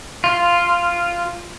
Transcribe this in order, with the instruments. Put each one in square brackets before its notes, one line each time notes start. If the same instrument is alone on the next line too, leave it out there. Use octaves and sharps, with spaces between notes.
[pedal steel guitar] F4